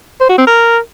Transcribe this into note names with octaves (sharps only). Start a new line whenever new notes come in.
C5
F#4
C4
A#4